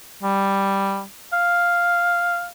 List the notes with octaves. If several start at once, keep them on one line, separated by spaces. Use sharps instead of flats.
G3
F5